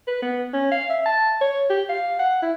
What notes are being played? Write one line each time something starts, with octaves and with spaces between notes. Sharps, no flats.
B4
B3
C#4
F5
E5
A5
C#5
G4
F5
F#5
E4